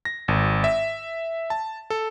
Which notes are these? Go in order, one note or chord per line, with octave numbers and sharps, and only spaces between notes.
A#6
G#1
E5
A5
A4